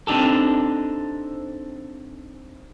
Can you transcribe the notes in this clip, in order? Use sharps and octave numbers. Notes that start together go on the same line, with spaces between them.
C4 D4 D#4 G4 A4